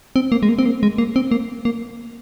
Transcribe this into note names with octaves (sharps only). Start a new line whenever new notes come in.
C4
A#3
G#3
A#3
C4
A#3
G#3
A#3
C4
A#3
A#3